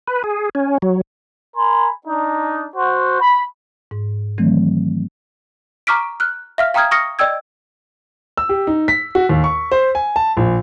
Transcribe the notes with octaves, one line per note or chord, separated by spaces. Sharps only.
B4
G#4
C#4
F#3
A#4 G#5 B5 C6
D4 D#4
F#4 C5
B5
G#2
D#3 E3 F#3 A3 C4
A#5 C#6 D6 F6 B6 D7
F6 F#6
E5 F5 F6
F5 G5 A#5 D#6 F6 G#6
C#6 D#6 F6 A#6 C#7
D5 D#5 G5 E6 G#6
E6
G4
D#4
B6
F#4
D#2
C#6
C5
G#5
A5
A#1